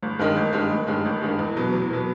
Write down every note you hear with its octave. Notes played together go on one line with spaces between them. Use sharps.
G1
G2 D#3 G#3
G1
G2 D#3 G#3
G1
G2 D#3 G#3
G1
G2 D#3 G#3
E2
B2 F#3 B3
E2
B2 F#3 B3